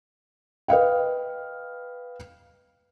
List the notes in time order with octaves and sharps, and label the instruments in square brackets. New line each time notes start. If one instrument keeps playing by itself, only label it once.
[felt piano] B4 D#5 F5 G5